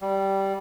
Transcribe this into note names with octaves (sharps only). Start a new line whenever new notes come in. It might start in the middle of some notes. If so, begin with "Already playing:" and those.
G3